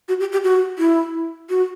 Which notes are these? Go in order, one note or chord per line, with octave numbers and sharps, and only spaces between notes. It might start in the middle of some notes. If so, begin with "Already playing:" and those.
F#4
G4
G4
F#4
E4
F#4